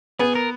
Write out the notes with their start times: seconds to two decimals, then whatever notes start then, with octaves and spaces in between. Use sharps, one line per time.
0.19 B3 G#4
0.35 A#4